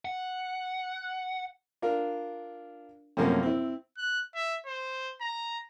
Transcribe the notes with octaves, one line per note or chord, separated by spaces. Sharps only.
F#5
D4 F4 A#4
F#2 A2 C3 F3 A#3 C#4
C4 E4
F#6
E5
C5
A#5